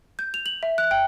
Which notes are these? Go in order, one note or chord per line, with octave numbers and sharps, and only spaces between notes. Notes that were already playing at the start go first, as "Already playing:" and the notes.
G6
F7
F#7
E5
F#6
G5